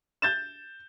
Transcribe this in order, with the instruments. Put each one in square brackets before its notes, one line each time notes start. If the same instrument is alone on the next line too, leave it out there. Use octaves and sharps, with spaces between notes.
[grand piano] G6 A6 E7